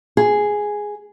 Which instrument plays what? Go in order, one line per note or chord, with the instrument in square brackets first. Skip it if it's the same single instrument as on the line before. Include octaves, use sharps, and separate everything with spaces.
[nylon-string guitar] G#4